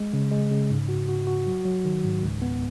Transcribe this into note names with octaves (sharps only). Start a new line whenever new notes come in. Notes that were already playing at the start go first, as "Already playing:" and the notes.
Already playing: G#3
C#3
G#3
C#3
G#2
F#4
F#4
F#4
F#3
F#3
D#3
G#2
C#2
B3